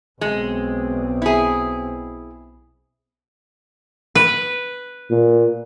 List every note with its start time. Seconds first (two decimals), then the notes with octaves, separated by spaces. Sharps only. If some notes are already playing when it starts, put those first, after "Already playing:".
0.21 B1 G#3 C4
1.22 E4 G#4
4.15 B4
5.11 A#2